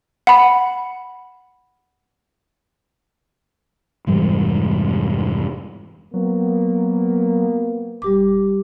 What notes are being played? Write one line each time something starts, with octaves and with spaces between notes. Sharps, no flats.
F#5 B5
F1 G#2 E3 G3
F#3 A#3 B3
D#1 G3 G4 D6